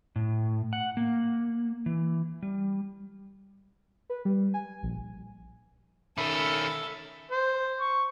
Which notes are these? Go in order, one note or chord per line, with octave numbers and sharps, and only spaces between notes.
A2
F#5
A#3
E3
G3
B4
G3
G#5
A#1
D#3 C#4 A4 E5 B5
C5
C#6